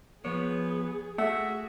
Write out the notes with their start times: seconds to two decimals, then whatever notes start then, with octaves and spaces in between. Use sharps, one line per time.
0.25 F3 B3 G#4 C#5
1.18 A3 F#4 G#4 E5 F#5